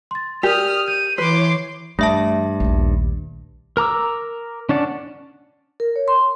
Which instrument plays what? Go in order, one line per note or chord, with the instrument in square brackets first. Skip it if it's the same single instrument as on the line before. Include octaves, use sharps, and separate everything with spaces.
[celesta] C6 A6
[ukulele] G4 [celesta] A#4 D5 [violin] D#6 F6
[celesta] G6 [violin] D#7
[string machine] E3 C#5 [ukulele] B4 [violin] C6 D6
[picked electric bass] G2 [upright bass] E3 C#4 [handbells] A3 E5 A5
[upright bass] A#1 D#2
[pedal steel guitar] A#4 A#5 D6 E6
C#4 D4 D5 F#5
[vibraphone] A#4
C#5
C6